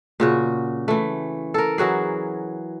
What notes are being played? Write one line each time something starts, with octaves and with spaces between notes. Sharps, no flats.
A#2 C#3 F#4
E3 A3
A4 A#4
E3 F#3 F#4 G#4